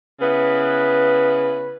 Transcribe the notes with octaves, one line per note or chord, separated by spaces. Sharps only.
C#3 B3 E4 B4